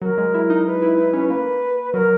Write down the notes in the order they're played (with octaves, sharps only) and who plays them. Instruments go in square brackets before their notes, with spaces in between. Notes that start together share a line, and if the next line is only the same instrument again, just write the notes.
[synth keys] F#3 [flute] A#4
[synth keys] G#3
E4
D#4
[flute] B4
[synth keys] E4
D#4
C#4
[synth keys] A#3 [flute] B4
[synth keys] F#3 [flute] A#4